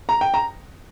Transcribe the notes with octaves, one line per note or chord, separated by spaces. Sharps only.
A#5
G5
A#5